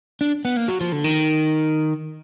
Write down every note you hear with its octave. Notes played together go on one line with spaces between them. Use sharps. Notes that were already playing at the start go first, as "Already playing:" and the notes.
D4
B3
A#3
F#3
F3
D3
D#3